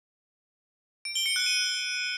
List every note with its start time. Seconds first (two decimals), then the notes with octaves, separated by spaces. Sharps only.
1.05 D7
1.15 G7
1.26 C#7
1.36 F#6
1.46 D#7